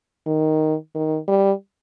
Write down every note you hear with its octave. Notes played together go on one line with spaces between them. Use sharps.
D#3
D#3
G3